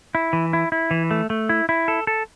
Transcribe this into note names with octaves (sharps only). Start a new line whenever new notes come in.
E4
E3
E4
E4
E3
A3
A3
E4
E4
A4
A4